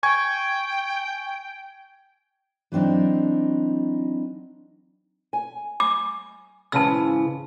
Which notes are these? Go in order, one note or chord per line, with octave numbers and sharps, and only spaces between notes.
G5 G#5 C#6 G#6
E3 F#3 C4 D4 D#4
G#5
D6
G#2 C#3 E3 A5 E6